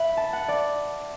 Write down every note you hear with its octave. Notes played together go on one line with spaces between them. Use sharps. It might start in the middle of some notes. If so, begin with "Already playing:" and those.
Already playing: E5 F#5 B5
A5
F#5
D5